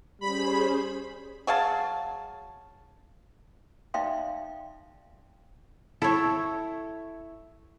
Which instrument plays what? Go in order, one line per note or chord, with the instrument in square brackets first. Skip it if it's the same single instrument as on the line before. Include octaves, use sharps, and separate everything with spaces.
[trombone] G3 [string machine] C#4 G#4 C5 [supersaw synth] B5
[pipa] F#3 G#4 F5 A5
[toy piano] D#4 D5 E5 F5 G5 C6
[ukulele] E4 [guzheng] A4 C#5